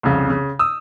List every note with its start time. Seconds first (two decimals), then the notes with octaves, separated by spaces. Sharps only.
0.03 C2 F2 C#3
0.30 C#3
0.59 D#6 E6